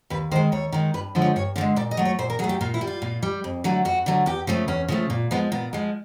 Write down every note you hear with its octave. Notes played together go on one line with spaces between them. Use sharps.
D#2 B4
D#3 G#3 C5
D#2 C#5
D#3 G#3
G2 B4
D3 F3 G#3
C#5
G2 C#5
D3 F3 D5
G#3
A#2 D5
D#5
F#3 A3
C#5
A#2 C5
A#4
F#3 A3 G#4
G4
A#2 F4
E4
G3
F4
A#2
G3
F2
D3 F#3 A3
F2 F#4
D3 F#3 A3
E2 G4
C#3 F3 A3
E2 C#4
C#3 F3 A3
A#2
F3 G#3 B3
A#2 B3
F3 G#3